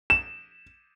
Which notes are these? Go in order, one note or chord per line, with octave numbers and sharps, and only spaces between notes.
E7